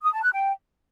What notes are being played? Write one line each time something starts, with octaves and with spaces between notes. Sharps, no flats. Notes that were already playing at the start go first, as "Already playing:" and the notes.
D#6
A5
F#6
G5